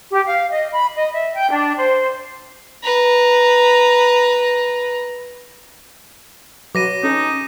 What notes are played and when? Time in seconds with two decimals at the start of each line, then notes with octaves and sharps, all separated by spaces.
0.10 G4
0.26 F5
0.50 D#5
0.73 B5
0.94 D#5
1.13 E5
1.34 G5
1.51 D4
1.78 C5
2.83 B4 A#5
6.75 F#3 B4 D6 A#6 D#7
7.03 C#4 D#4 A4